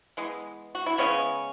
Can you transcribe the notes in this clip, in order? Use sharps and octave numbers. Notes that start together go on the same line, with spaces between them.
E3 G#3 B3
F#4
E4
C#3 G#3 B3 C#4